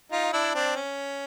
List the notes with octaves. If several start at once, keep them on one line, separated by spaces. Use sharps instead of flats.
D#4 F4
D4 E4
C4 D4
C#4